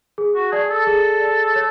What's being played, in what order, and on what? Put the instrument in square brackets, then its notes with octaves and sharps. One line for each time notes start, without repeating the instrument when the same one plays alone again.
[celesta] G#4
[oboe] F#4
[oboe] G#4 [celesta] D5 A5
[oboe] A4
[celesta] G#4
D5 A5
C#5